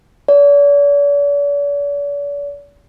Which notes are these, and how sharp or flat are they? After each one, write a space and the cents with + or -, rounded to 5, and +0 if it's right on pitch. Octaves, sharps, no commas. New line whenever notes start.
D5 -45